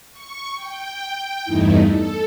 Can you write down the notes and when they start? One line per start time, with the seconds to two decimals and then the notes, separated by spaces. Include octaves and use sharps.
0.11 C#6
0.55 G5
1.45 E2 G2 A3 D#4 E4
1.86 A4